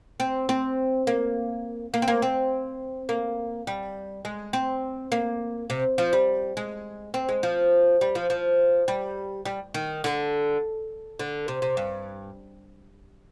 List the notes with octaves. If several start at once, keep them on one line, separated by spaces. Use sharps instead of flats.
C4
C4
A#3
A#3
C4
A#3
C4
A#3
G3
G#3
C4
A#3
C3
F3
G3
G#3
C4
G#3
F3
G3
F3
F3
G3
G3
D#3
D3
D3
C3
C3
G2